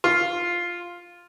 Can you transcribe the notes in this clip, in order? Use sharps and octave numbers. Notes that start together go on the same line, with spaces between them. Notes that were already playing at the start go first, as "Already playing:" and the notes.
F4